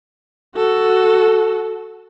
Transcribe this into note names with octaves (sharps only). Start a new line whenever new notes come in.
F#4 A4